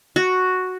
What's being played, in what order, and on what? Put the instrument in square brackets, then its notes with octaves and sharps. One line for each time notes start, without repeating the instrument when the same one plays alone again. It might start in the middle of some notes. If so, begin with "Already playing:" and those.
[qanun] F#4